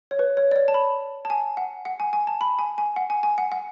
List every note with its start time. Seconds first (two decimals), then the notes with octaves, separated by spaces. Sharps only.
0.11 C#5
0.19 B4
0.37 C#5
0.51 D5
0.56 C#5
0.68 A5
0.74 B5
1.25 A5
1.30 G#5
1.57 F#5
1.85 F#5
2.00 G#5
2.13 G#5
2.27 A5
2.41 B5
2.59 G#5
2.78 G#5
2.96 F#5
3.10 G#5
3.23 G#5
3.38 F#5
3.52 F#5